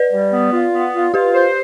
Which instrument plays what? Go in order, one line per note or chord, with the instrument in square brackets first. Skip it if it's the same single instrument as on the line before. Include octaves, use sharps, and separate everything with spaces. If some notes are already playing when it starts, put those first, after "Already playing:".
Already playing: [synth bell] B4 D5
[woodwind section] G3
B3
F4
B3
F4
[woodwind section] F4 [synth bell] G4 B4
[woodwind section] C5